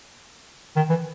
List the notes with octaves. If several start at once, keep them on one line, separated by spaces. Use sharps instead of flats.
D#3
E3